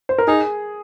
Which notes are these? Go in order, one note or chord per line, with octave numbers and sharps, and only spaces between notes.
C5
A#4
D#4 G#4